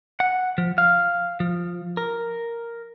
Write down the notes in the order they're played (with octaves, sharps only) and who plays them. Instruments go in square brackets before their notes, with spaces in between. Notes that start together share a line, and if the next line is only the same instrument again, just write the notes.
[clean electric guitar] F#5
F3
F5
F3
A#4